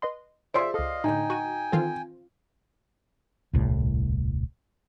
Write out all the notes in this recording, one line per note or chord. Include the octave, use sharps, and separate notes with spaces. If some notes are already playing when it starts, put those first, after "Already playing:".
B4 D#5 C6
F4 G#4 C5 D5 E5 C6 D7
C#2 A4 D#5 F5
A2 D3 D#4 G5 G#5
F#4 C#6 D#7
D#3 E3 C4 F4 A4
D#1 C2 A2